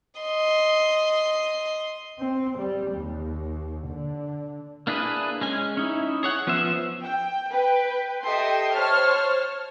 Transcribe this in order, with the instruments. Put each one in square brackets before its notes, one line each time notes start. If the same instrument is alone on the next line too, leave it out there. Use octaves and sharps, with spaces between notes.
[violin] D#5 C6
[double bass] C4
G3
D#2
D3
[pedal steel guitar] A#3 D4 E4 G#4 B4
G#3 C#4 G#5
C#4 D#4 E4
G#4 C#5 F#5
F3 B3 C#4 C5 E5
[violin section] G5
B4 G5
G4 A4 D#5 E5 G5 C6
C5 C#5 A5 F6